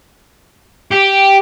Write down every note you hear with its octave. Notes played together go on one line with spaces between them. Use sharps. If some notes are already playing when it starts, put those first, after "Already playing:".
G4